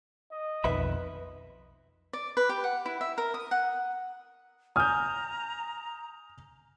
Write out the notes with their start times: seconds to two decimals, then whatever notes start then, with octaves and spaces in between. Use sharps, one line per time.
0.32 D#5
0.64 B1 F2 D#3 B4 E5 B5
2.13 D5
2.37 B4
2.49 G4
2.64 F#5
2.86 E4
3.01 E5
3.18 A#4
3.34 D#6
3.51 F#5
4.76 G#5 A#5 D#6 F6 G6